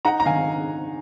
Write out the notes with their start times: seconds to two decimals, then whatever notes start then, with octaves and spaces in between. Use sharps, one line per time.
0.05 D#4 F#5 A#5
0.20 A#5
0.26 D#3 F5 G#5